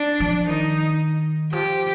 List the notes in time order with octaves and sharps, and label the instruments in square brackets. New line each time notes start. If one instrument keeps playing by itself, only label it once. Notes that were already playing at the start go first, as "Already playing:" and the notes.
Already playing: [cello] D4
[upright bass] F3
[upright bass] D#3 [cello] D#4
[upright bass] F3 [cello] G4